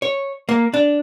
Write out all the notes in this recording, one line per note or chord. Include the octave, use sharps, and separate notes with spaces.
C#5
A#3
D4